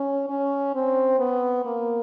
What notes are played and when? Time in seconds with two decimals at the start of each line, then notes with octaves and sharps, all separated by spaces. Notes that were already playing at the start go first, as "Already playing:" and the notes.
Already playing: C#4
0.30 C#4
0.75 C4
1.19 B3
1.65 A#3